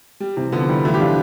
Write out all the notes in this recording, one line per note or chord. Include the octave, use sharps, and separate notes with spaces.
G3
C3 E3
D3 F3 B3
E3 G3
E3 F3 A3
G4
D4 F4